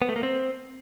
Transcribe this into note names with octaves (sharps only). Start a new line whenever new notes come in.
B3
A3
A#3
C4